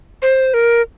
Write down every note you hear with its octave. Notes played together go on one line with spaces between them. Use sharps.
C5
A#4